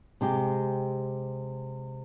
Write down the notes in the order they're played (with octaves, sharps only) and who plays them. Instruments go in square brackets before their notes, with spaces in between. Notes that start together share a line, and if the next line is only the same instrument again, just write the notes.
[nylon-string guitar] C3 G#3 G4